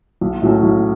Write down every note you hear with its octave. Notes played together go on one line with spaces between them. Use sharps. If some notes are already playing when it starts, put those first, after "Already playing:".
B1
A2 F#3 A3 C#4
B1